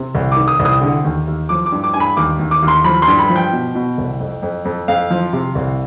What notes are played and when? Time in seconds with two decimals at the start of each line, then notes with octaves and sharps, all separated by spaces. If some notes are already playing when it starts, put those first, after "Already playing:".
Already playing: C3
0.15 C2
0.32 D#3 D6
0.48 D#6
0.59 C2
0.65 D#6
0.81 D3
1.04 D#2
1.27 D#2
1.49 F3 D6
1.66 D6
1.72 G2
1.84 D6
1.94 G2 G#5
2.00 B5
2.17 D#2 D6
2.39 D#2
2.51 D6
2.63 D#2
2.68 C6
2.85 F3 B5
3.02 C6
3.08 G2
3.19 B5
3.30 F3
3.36 G5
3.53 B2
3.75 B2
3.98 C2
4.20 F2
4.43 F2
4.65 F2
4.88 F2 F5
5.11 F3
5.33 C3
5.55 C2